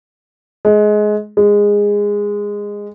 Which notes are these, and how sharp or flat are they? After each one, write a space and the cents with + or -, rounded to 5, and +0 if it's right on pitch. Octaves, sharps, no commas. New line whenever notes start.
G#3 +20
G#3 -15